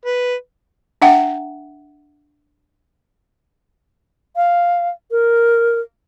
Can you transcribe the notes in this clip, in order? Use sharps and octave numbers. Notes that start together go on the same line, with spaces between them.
B4
D4 E5 F#5 G5
F5
A#4